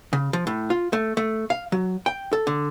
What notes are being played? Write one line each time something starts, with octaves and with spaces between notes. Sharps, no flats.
C#3
F3
A2
F4
A3
A3
F5
F#3
G5
A4
D3